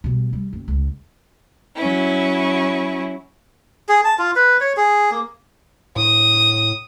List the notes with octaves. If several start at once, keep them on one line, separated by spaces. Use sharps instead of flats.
B2 G3
G3
F#1
C#2
F#3 C#4 E4
G#4
A5
F4
B4
C#5
G#4
A#3
A2 D#6